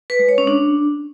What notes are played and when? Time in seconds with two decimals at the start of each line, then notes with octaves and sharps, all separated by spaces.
0.10 B4
0.19 G#3
0.29 C#5
0.38 C#4
0.47 D4